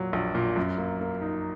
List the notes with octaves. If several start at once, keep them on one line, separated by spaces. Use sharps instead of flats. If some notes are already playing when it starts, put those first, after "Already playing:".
Already playing: A#2 F#3
A#1
A#2
F#2
A#3
A#3
D#4